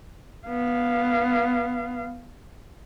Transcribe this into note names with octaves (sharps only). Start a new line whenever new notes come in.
B3 F5